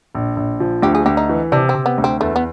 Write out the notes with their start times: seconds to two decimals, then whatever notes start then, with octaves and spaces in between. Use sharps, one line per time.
0.15 A#1
0.37 A#1
0.60 F3
0.82 D2 G4
0.95 G#4
1.06 D2 G4
1.17 D#4
1.29 E3
1.52 C3 D4
1.69 C4
1.75 C3
1.86 B3
1.98 D2
2.04 C4
2.20 E2 A3
2.36 B3